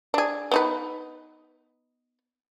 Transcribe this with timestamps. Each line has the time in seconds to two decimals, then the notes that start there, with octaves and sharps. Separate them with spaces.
0.14 D4 G#4
0.51 B3 D#4 B4